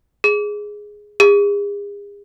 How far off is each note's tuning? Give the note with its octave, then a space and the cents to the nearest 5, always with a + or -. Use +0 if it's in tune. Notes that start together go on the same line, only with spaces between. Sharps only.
G#4 +0
G#4 -40